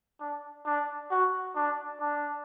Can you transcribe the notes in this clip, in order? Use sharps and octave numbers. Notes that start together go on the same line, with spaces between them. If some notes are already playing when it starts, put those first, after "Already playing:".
D4
D4
F#4
D4
D4